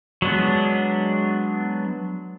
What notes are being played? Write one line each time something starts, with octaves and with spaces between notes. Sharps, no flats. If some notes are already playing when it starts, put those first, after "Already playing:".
F#3 G#3 B3 D4